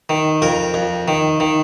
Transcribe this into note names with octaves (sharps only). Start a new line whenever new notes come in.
D#3
F2 A#4
F2
D#3
D#3